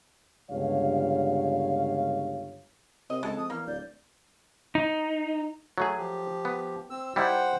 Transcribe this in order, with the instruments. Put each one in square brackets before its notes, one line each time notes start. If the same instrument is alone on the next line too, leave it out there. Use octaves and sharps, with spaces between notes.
[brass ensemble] G1 C#2 G2 C#5 F5
[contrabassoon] C3 [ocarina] C4 [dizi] A#4 [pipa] D#5
[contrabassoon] C#2 [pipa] G#3 A4 [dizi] A5
[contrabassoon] F2 [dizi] D#6
[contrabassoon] E2 [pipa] A#3 [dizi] F6
[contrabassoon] D1 [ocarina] D5 [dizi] G6
[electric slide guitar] D#4
[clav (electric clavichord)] F#3 A3 G#4
[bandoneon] F3 G4
[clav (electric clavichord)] B3
[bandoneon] C4 E6
[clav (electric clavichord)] G3 D#4 E4 [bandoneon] C5 F#5 G5